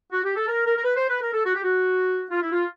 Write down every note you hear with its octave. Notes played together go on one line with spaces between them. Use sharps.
F#4
G4
A4
A#4
A#4
A#4
B4
C5
B4
A#4
A4
F#4
G4
F#4
F4
E4
F4